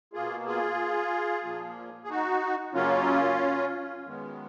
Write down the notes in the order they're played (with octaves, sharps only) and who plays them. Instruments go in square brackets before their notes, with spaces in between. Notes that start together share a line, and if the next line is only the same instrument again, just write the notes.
[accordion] B2 A#3 F4 G#4
F4 G#4
A#2 F3 A#3
G#4
D#4 F#4
F#2 C#3 F#3 A#3 C#4 F4
F#2 D#3 G#3 B3